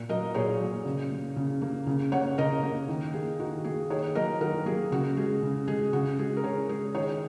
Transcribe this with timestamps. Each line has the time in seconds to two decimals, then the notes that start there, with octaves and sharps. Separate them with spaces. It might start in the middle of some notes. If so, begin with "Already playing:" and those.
Already playing: A#2
0.09 F#3 A#3 A#4 D#5
0.34 A#2 G#4 C#5
0.60 F#3 A#3
0.85 C#3
1.12 A#3
1.36 C#3
1.62 A#3
1.87 C#3
2.12 A#3 C#5 F#5
2.38 C#3 A#4 D#5
2.63 A#3
2.89 D#3
3.13 A#3 G#4
3.39 D#3 F#4
3.64 A#3 G#4
3.90 D#3 G#4 C#5
4.15 F#3 A#3 A#4 D#5
4.41 D#3 F#4 A#4
4.66 F#3 A#3 G#4
4.92 C#3 F#4
5.17 G#3 G#4
5.43 C#3
5.68 G#3 G#4
5.93 C#3 F#4
6.19 G#3 G#4
6.37 A#4
6.44 C#3 G#4 C#5
6.69 G#3 G#4
6.95 D#3 G#4 C#5